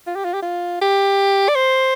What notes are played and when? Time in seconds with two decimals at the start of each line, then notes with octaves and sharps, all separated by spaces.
0.07 F4
0.16 G4
0.25 F4
0.34 G4
0.42 F4
0.81 G4
1.49 D5
1.56 C5